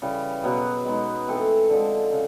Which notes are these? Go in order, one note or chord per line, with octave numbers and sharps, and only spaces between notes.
C#3 E3 G3
B2 F#3 B3
G#3 B3 D#4
E3 A3 C4
D3 F3 G#3
C#3